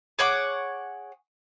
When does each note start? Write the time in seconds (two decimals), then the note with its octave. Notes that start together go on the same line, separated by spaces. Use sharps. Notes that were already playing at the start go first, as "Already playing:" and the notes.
0.19 G#4 C#5 F#5 D6